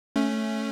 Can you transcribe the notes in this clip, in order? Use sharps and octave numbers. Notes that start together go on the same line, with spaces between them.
A3 C#4